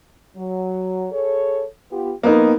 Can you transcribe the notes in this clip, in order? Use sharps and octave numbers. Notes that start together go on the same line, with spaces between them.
F#3
G#4 A4 C#5
B3 F4 G4
F2 A#3 B3 D#4